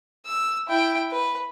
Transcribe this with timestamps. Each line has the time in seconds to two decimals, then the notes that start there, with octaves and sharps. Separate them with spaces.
0.26 E6
0.68 E4 G5
1.11 B4